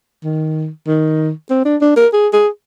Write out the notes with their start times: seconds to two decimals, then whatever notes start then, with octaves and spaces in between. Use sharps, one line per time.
0.24 D#3
0.87 D#3
1.50 C4
1.65 D4
1.81 D4
1.97 A#4
2.13 G#4
2.33 G#4